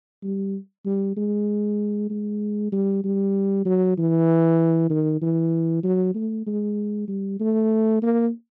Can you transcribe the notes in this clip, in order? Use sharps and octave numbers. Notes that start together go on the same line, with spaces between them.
G3
G3
G#3
G#3
G3
G3
F#3
E3
D#3
E3
F#3
A3
G#3
G3
A3
A#3